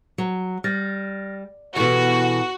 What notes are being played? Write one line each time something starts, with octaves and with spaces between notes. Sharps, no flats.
F#3
G3 F6 A6 A#6
B2 E3 F#4 G4 A4 B4